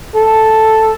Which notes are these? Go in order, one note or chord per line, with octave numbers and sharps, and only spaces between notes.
A4